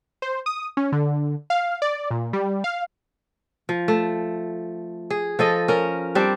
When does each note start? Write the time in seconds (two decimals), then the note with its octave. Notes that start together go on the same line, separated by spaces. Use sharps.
0.22 C5
0.46 D#6
0.77 C#4
0.92 D3
1.50 F5
1.82 D5
2.11 A#2
2.33 G3
2.64 F5
3.69 F3
3.88 A3
5.10 G#4
5.39 F3 A4 D#5
5.68 C#4 A#4
6.15 G3 C4 D4